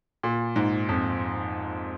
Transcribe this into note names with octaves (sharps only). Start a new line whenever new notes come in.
A#2
G#2
F2